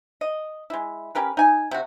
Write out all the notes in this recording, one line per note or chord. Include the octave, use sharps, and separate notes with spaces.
D#5
G#3 E4
C#4 G4 A#4 B4
D#4 G#5
C3 F#4